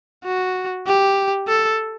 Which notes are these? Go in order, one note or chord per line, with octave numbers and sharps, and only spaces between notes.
F#4
G4
A4